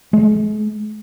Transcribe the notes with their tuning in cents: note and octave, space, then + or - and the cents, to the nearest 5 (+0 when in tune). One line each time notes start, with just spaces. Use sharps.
G#3 +40